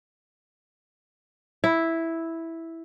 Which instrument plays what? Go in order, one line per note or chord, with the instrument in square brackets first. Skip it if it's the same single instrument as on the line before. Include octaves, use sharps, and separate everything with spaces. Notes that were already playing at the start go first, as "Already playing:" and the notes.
[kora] E4